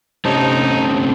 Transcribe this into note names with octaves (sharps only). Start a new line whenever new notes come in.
C3 A3 C4 C#4 D#4 A5